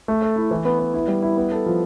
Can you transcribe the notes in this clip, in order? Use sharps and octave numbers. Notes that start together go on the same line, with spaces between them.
A3
A4
E4
E3
B3
B3
E4
G3
E4
B3
A4
F3